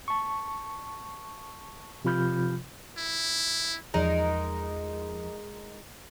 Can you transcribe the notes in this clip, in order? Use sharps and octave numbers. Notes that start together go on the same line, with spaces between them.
A5 C#6
C3 F3 F4 B5 F6 G6
E4
E2 F3 G#3 D#4 A#4 A#5